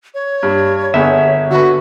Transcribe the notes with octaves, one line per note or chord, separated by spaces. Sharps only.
C#5
G2 G3
G1 B3 G#4 E5
D3 F#4 B4